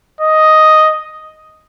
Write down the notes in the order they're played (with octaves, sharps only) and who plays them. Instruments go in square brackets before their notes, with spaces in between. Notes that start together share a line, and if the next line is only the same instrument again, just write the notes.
[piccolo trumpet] D#5